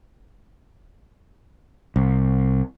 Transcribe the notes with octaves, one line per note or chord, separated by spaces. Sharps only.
C2